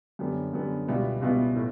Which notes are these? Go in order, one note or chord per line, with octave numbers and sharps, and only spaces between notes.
F#2 D3 G3 B3
F#2 D3 G3 B3
C#2 B2 G3 B3 E4
C#2 B2 G3 B3 E4
A2